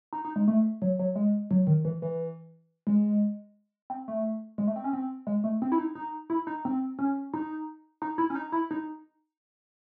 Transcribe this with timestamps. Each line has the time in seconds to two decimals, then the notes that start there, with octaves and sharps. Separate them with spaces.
0.13 D#4
0.25 D#4
0.36 G#3
0.48 A3
0.82 F#3
0.99 F#3
1.16 G#3
1.51 F#3
1.67 D#3
1.85 E3
2.02 E3
2.87 G#3
3.90 C4
4.08 A3
4.58 G#3
4.67 A3
4.76 C4
4.84 C#4
4.93 C4
5.27 G#3
5.44 A3
5.62 C4
5.72 E4
5.78 D#4
5.95 D#4
6.30 E4
6.47 D#4
6.65 C4
6.99 C#4
7.34 D#4
8.02 D#4
8.18 E4
8.30 C#4
8.35 D#4
8.52 E4
8.71 D#4